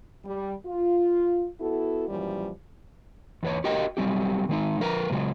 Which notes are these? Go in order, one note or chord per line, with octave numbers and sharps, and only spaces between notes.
G3
F4
B3 E4 F#4 A4
F#2 A#2 E3 F3 G3
E2 B4 C#5
F#4 G4 A#4 D#5 G5
F#3 G3 C4 G4
D#3 G#3 D#4
F3 A#4 B4 A#5
A2 C#3 F#3 G#3